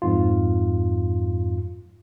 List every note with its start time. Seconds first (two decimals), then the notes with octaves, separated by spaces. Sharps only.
0.02 F2 G#2 F4